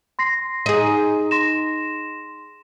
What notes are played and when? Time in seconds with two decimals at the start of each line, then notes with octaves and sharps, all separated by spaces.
0.19 C6 A#6 C7
0.66 D#4 G#4
1.31 C6 A#6 E7